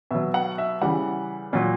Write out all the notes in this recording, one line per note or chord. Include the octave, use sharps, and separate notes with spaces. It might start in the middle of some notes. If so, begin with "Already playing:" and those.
B2 F#3 E5
F#5
E5
C#3 E3 G3 F#5
A#2 F#3